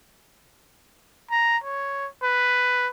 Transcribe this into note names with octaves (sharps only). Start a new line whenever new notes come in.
A#5
C#5
B4